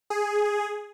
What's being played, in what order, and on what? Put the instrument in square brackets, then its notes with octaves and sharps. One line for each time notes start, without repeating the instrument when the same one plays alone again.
[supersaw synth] G#4